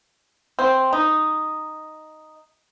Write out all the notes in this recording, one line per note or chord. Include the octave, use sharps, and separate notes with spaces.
C4
D#4